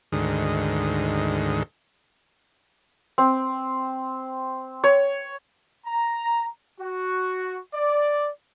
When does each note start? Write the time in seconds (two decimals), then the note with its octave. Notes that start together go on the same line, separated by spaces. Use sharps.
0.12 D2 G#2 D#3
3.18 C4
4.84 C#5
5.86 A#5
6.80 F#4
7.74 D5